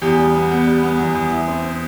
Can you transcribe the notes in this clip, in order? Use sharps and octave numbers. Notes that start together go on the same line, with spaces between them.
E2 G4
G3
B3
B3
G3
B3
E2
E2
E4
C4
C4